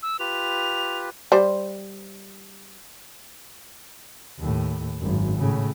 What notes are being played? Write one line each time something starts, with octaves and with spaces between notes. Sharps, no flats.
E6
F4 G4 B4 F7
G3 C5
D#2 A2
G#1 F#2
A2 C#3